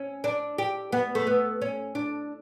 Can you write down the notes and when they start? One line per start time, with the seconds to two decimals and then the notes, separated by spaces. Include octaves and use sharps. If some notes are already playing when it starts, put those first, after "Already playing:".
Already playing: C#4
0.24 D4
0.58 G4
0.92 B3
1.15 A3
1.27 B3
1.62 C#4
1.95 D4